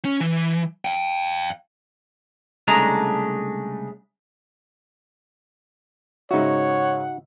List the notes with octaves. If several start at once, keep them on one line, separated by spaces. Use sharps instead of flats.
C#4
E3
F5 G5
C2 C#3 G#3 A3 D4 A#5
G#2 C#3 D#4 F#4 C#5 E5 F#5